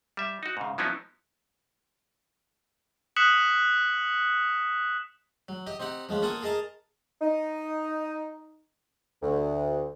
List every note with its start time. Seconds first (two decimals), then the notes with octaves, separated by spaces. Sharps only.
0.17 G3 E5
0.43 D#4 F#4
0.57 G#2 C#3
0.78 F3 F#3 B3 C#4 D#4 E4
3.16 D#6 F#6 B6 C#7 E7 F#7
5.49 F#3
5.67 G4 D#5
5.80 C4 D#4 G4 F#5
6.09 F3 G#3 B3 C#4
6.22 A#3 F4 A4 F#5 G#5 D#6
6.42 G#4 A#4 D#5 A5 A#5
7.22 D#4
9.22 D2